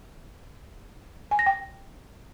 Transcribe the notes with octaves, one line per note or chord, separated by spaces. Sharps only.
G#5
A#6
G5